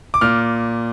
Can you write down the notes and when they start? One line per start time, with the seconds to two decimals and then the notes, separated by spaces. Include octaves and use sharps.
0.14 D6
0.21 A#2 F6